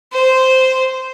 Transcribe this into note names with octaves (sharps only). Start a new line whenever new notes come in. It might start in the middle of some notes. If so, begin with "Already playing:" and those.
C5